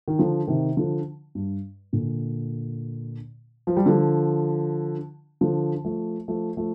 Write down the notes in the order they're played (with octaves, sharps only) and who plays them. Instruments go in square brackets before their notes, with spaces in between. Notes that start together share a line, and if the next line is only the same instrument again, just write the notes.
[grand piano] D#3
D3 F3
C3 D#3
D3 F3
G2
A#2 D3
F3
G3
D3 F3
D3 F3
F3 A3
F3 A3
F3 A3